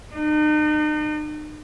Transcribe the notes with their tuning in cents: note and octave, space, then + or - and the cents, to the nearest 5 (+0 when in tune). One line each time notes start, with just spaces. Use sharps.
D#4 -40